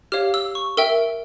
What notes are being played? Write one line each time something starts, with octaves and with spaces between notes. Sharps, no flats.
G4 C#5 F5 F6
E6
C#6
A#4 E5 G5 E6